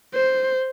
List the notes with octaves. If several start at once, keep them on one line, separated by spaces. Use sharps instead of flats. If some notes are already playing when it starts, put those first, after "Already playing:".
C5